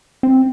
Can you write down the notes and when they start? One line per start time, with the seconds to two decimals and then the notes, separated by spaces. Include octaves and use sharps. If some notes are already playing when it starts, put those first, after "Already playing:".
0.23 C4